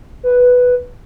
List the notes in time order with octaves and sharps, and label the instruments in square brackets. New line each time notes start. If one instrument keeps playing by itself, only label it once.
[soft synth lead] B4